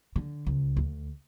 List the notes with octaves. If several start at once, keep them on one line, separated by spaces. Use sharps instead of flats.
D3
C#2
D2